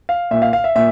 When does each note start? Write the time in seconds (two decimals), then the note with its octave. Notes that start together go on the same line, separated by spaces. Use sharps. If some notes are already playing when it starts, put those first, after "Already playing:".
0.09 F5
0.31 A#2 E5
0.42 F5
0.53 F5
0.64 E5
0.75 A#2 E5